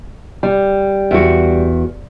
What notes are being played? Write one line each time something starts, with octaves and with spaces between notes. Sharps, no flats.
G3
E2 F#4